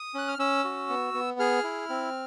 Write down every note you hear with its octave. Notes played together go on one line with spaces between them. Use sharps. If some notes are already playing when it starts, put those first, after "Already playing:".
Already playing: D#6
C#4 F#6
F6
C#4 E6
F#4
B3
B3
G#4 F6
E4
C4